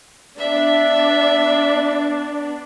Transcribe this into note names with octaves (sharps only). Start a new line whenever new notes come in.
B3 D4 E5